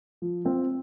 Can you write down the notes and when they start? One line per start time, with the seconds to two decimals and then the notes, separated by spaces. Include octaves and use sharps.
0.22 F3
0.45 C4 F4